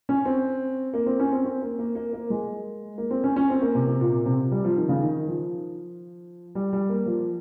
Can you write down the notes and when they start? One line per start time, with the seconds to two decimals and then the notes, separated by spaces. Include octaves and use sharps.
0.09 C#4
0.25 C4
0.94 A#3
1.06 C4
1.20 C#4
1.32 C4
1.45 C4
1.62 A#3
1.79 A#3
1.95 A#3
2.13 A#3
2.30 G#3
2.98 A#3
3.11 C4
3.24 C#4
3.36 C#4
3.50 C4
3.61 A#3
3.75 C3
3.87 C3
4.00 A#2
4.26 C3
4.52 G3
4.64 F3
4.77 D#3
4.89 C#3
5.02 D#3
5.28 F3
6.55 G3
6.73 G3
6.89 A#3
7.06 F3